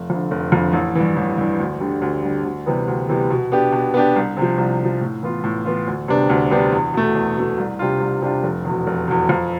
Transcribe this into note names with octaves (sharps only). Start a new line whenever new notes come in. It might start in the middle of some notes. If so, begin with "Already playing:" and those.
Already playing: F1
F2 D3
F1
F2 D3
A1
G2 E3
A1
G2 E3
D2
D3 G3 D4
D2
D3 G3 D4
D2
C3 E3 G3 B3
D2
C3 E3 G3 B3
B2
B3 D4 G4
B2
B3 D4 G4
C2
C3
F3
C2
C3 F3
A2
E3 B3 F4
A2
E3 B3 F4
D2
C3 G3 B3 D4
D2
C3 G3 B3 D4
E2
B2 A3
E2
B2 A3
C2
C3 G3 D4 F4
C2
C3 G3 D4 F4
F1
E2 B2
F1
E2 B2
F2